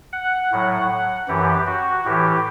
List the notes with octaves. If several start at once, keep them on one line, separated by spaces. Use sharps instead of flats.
F#5
A2 F#3
F#2 E3 G4
F#4
A2 E3 G4